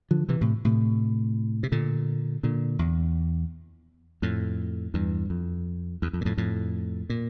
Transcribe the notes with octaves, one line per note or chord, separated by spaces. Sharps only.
D3 F3
C3 E3
A2 C3
A2 C3
C3
A#2 D3
A#2 D3
E2
F2 A2
E2 G2
F2
E2
F2
A#2
F2 A2
F2 A2
A#2